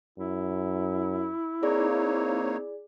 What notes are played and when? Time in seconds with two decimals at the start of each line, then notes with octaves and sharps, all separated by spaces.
0.18 F#2 E4
1.63 A#3 C4 D#4 G#4 C#5 D5